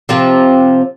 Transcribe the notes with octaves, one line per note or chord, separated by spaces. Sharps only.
C3 F3 C4